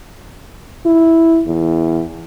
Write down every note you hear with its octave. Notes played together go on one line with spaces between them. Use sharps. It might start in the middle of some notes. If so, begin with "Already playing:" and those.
E4
E2